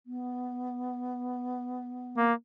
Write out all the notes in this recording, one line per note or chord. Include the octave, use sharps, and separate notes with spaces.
B3
A#3